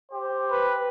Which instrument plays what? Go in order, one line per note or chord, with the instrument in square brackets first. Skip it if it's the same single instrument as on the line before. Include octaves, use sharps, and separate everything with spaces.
[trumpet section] G4 C5
[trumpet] B4